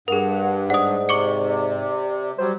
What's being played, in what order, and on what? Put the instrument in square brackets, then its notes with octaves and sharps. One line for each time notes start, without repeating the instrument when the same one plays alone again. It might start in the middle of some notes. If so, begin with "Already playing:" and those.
[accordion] G2 [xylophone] G#4 A#4 [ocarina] F#5
[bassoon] G#2 [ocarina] D5 [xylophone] F#5 D#6
[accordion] C3 [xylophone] C#6 D6 C#7
[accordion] F#3 G3 [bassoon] C5